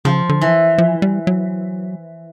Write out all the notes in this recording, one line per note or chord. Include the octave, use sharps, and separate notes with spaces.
C#3 F3
D3
E3
F3
G3
F#3